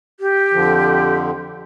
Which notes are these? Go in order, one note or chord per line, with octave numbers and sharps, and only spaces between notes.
G4
F2 D3 F3